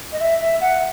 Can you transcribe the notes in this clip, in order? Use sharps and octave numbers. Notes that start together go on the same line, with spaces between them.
D#5
E5
E5
F#5